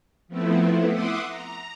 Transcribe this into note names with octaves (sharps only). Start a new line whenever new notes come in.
F3 A3 B3 C4 E4
E5 F#5 C6 D6 D#6
A#5